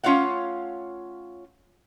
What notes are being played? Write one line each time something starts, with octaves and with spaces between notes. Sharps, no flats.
A3 C#4 F4 C#5 F5 F#5